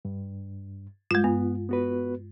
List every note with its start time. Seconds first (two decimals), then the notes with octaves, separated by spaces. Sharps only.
0.05 G2
1.11 G2 G#3 F4 G6
1.24 G2 B3
1.69 B3 F#4 B4